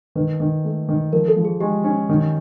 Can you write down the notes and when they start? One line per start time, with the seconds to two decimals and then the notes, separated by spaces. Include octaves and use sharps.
0.15 D#3 B4
0.40 D#3
0.64 A3
0.89 D#3
1.12 F3 A#4
1.28 A4
1.36 F3
1.45 G#4
1.60 G#3 G4
1.84 C#4
2.09 D#3